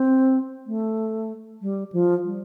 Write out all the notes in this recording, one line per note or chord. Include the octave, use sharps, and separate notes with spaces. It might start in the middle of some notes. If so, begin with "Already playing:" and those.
Already playing: C4
A3
G3
F3
G3